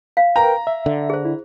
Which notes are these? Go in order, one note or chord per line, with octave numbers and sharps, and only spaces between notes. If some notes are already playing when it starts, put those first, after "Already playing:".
F5
A#4 B4 G5 A#5
E5
D3
G#4 C5
E4